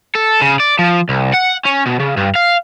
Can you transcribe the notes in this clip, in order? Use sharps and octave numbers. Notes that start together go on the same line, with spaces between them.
A4
C#3
D5
F3
C2
F#5
C#4
B2
C#3
G2
F5